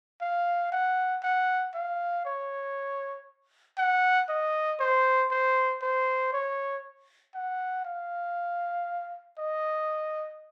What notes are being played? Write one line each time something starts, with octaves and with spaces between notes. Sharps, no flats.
F5
F#5
F#5
F5
C#5
F#5
D#5
C5
C5
C5
C#5
F#5
F5
D#5